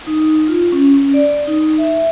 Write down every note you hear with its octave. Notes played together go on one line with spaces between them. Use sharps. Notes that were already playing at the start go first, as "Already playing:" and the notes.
D#4
F4
C#4
C#4
D5
D#4
E5